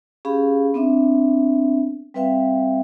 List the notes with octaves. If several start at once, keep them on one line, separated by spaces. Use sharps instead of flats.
C#4 G4 G#4 F5 B5
B3 C4 D4 E5
G3 C4 B4 E5 F5 G5